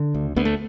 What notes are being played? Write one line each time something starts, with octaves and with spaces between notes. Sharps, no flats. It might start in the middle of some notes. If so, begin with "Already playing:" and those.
Already playing: D3
D2
D2 B3
A3